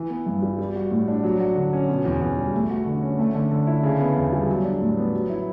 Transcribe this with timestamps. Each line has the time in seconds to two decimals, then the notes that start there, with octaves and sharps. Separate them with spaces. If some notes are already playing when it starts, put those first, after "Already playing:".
Already playing: E3
0.10 B3
0.26 G2
0.42 G3
0.59 G3
0.75 F#4
0.91 A2
1.08 D4
1.24 F#3
1.40 F#4
1.56 D3
1.73 C#4
1.89 B2
2.05 E2
2.21 E2
2.37 G3
2.54 A3
2.70 F#4
2.86 D3
3.02 C#4
3.19 A3
3.35 D3
3.51 D3
3.67 E4
3.83 C#3
4.00 B3
4.16 E2
4.32 G3
4.48 F#3
4.64 D4
4.81 A2
4.97 B3
5.14 F#3
5.30 E4